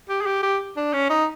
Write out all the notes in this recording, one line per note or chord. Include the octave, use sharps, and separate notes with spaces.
G4
G#4
G4
G4
D4
C#4
D#4